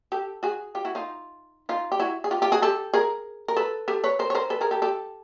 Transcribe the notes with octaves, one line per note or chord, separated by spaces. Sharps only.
G4 A4
F#4 G#4
F4 G4
E4 F#4
D#4 F4
D#4 F4
G4
E4 F#4
G#4
F4 G4
F4 G4
F#4 G#4
G4 A4
G#4 A#4
A#4
A4 B4
G4 A4
B4 C#5
A#4 C5
C#5
A#4 C5
A4 B4
G#4 A#4
G4 A4
G4 A4